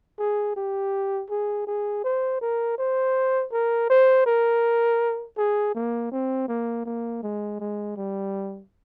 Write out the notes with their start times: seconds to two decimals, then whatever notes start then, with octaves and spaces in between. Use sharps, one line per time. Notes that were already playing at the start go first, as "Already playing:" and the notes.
0.19 G#4
0.56 G4
1.30 G#4
1.67 G#4
2.04 C5
2.41 A#4
2.78 C5
3.52 A#4
3.90 C5
4.26 A#4
5.37 G#4
5.75 A#3
6.12 C4
6.48 A#3
6.86 A#3
7.23 G#3
7.60 G#3
7.97 G3